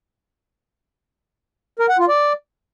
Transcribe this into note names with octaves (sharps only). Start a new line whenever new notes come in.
A#4
F#5
F4
D5